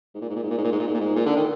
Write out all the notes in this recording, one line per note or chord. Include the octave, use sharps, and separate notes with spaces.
G#2
A#2
G#2
A#2
G#2
A#2
G#2
A#2
G#2
A#2
G#2
A#2
G#2
A#2
D3
D#3